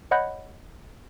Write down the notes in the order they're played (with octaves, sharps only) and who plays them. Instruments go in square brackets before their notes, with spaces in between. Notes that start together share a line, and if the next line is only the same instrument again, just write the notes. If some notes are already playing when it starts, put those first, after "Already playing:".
[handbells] C#5 D#5 F#5 B5 F#6 G6